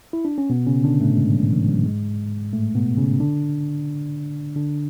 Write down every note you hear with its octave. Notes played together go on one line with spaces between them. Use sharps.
E4
D4
C#4
B2 B3
C#3 C#4
D3 D4
A2 A3
G#2 G#3
F#3
E3
F#3
G#2 G#3
A2 A3
B2 B3
C#3 C#4
D3 D4
D3 D4